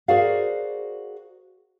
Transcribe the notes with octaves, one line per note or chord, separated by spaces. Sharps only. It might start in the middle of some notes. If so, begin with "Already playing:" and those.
F#4 G#4 A#4 C5 D5 F5